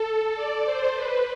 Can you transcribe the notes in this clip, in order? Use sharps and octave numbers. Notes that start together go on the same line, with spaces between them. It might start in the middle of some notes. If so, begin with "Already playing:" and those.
Already playing: A4
D5
C5
B4